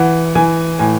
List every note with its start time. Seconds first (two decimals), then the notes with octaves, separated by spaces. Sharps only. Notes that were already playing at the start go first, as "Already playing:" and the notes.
Already playing: E3 F#5
0.35 E3 G#5
0.79 A2 G#5